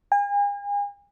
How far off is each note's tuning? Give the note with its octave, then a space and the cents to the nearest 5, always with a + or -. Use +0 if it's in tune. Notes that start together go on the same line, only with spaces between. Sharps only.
G#5 -40